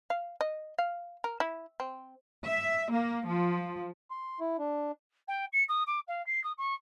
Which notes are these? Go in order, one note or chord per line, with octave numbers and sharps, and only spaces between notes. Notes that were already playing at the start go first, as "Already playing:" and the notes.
F5
D#5
F5
A#4
E4
C4
E5
A#3
F3
C6
E4
D4
G5
C#7
D#6
D6
F5
C7
D#6
C#6